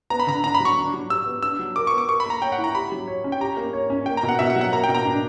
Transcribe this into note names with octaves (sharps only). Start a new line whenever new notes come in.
B3 A#5
B5
D3 A#5
D4 A#5
B5
F#3
C#6
D4
F#3
G4 E6
B3
D4 E6
F#3
A#4 D6
B3 C#6
D6
A#4 C#6
B5
A#3 A#5
C#5 G5
F#5
E4
A#5
G4 B5
F#3
C#5
C#4
G5
G4 A#5
A#3
C#5
C#4
A#3 G5
A#5
B2
F#5
B2 E5
F#5
F#3
F#5
A#3 A#5
G5
B2
A#5
D4